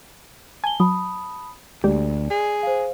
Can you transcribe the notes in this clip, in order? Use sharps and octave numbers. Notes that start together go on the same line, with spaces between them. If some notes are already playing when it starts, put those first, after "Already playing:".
G#5 A5 G7
F#3 A5 B5 D#6
D2 G#3 G4 D5
G#4
C5 F5